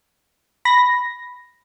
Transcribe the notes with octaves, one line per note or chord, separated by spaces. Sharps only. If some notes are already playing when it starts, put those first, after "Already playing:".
B5 A#6